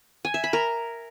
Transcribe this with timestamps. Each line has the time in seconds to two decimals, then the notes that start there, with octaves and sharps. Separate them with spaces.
0.25 G#5
0.34 E5
0.44 B5
0.53 A#4